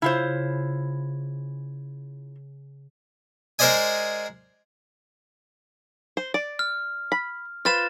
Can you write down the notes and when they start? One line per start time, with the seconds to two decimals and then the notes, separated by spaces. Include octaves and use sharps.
0.02 C#3 E4 F4 C5
3.59 G#3 A#4 C5 D5 D#5 G#5
6.17 C5
6.34 D5
6.59 F6
7.12 B5
7.65 F4 B4 C5 F6 A6 E7